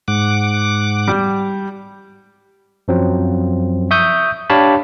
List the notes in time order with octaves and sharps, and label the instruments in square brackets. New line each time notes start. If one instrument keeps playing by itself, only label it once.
[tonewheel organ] G#2 F#5 D6
[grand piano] G3
[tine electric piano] F#2 F3 F#3 C4
E5 C#6 D#6 G6
D4 G4 C#5 F5 A5 B5